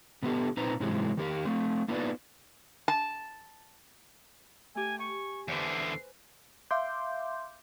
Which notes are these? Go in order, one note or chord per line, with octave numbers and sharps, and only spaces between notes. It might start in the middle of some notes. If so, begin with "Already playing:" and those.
B2 D3 B3 C4 G4 A4
A#2 C4 D#4 B4 C5 A#5
G#2 C3 E3 F#3 G#3
D#3 G4 A#4
A3 C4
A#3 B3 D#4 F4 B4 D5
A5
A3 G4 G#5
G#5 C#6
E2 D3 B4 C5
C7
E5 F5 C6 D6 G6